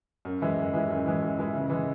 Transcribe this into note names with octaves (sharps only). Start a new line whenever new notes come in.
F#2
E3 G#3 E4
F#2
E3 G#3 E4
F#2
E3 G#3 E4
F#2
E3 G#3 E4
C#3
E3 G#3